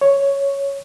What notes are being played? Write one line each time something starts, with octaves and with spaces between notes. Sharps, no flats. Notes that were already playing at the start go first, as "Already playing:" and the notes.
C#5